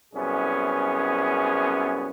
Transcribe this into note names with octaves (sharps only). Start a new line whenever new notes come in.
C2 F#2 B3 C#4 G#4